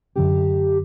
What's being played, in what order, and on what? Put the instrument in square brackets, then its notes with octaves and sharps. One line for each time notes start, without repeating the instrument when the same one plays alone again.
[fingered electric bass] F#2 D3 F#3 C#4 [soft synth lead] G4